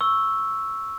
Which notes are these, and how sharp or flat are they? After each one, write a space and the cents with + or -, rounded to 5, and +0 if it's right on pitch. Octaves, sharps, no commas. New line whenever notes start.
C#6 +0 E6 +0